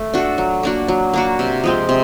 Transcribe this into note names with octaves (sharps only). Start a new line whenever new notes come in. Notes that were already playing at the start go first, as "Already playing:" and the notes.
Already playing: A3
D4 F#4 A4
F#3
A#3 D4 F#4
F#3
A#3 D4 F#4
C3
F3 G#3 C4
C3